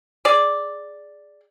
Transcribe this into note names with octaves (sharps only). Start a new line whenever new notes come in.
G#4 D5